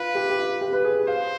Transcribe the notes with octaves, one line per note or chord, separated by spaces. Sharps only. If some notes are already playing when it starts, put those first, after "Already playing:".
Already playing: F4 B4
G4
G4
F4
G4
B4
G#4
C5 F5